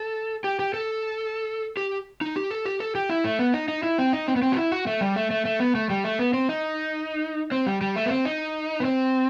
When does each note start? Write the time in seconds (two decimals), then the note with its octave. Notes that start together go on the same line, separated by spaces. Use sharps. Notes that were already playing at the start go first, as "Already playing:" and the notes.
Already playing: A4
0.44 G4
0.59 G4
0.74 A4
1.77 G4
2.21 D#4
2.36 G4
2.51 A4
2.66 G4
2.80 A4
2.95 G4
3.10 E4
3.24 A3
3.39 B3
3.54 D#4
3.68 D#4
3.83 E4
3.98 C4
4.13 D#4
4.28 C4
4.36 B3
4.42 C4
4.52 F#4
4.57 E4
4.72 F#4
4.87 A3
5.01 G3
5.16 A3
5.31 A3
5.45 A3
5.60 B3
5.75 A3
5.90 G3
6.04 A3
6.19 B3
6.33 C4
6.49 D#4
7.52 C4
7.67 G3
7.81 G3
7.96 A3
8.06 B3
8.11 C4
8.25 D#4
8.80 B3
8.85 C4